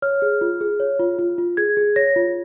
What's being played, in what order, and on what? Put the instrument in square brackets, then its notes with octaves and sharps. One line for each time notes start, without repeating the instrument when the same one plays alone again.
[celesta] C#5 F6
G#4
F4
G#4
C#5
F4
F4
F4
G#4 G#6
G#4
C#5 A#6
F4